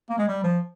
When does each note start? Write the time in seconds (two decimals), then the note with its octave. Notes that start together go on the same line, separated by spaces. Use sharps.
0.10 A#3
0.18 G#3
0.28 G3
0.44 F3